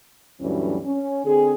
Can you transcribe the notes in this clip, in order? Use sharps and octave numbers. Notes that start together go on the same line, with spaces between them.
D2 G2 E3 F#3 C#4
C#4
D3 C4 G#4